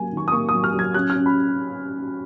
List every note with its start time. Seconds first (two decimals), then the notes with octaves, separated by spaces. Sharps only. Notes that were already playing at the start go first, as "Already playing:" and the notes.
Already playing: F#3 A#3 G#5
0.12 D#3 C#6
0.28 D#6
0.32 A#3 C#6
0.49 D#6
0.54 F#3
0.64 F6
0.74 F#3
0.79 G#6
0.94 C#4 F#6
1.10 F6
1.15 C#4
1.26 B5